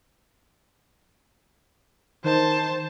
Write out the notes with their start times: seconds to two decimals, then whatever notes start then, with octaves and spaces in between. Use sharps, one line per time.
2.24 D#3 C5 A5